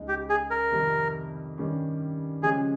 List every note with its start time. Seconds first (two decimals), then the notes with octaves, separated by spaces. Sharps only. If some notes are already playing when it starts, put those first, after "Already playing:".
Already playing: C#2 C#3 G#3 D#4
0.08 G4
0.29 G#4
0.50 A#4
0.71 F2 C3 D#3 G3
1.58 G2 D#3 G3 C#4 G4
2.42 C#3 F3 G#3 C#4 G4 G#4